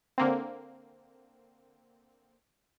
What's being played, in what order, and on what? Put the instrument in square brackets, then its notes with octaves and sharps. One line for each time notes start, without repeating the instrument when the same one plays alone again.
[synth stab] D3 A#3 C4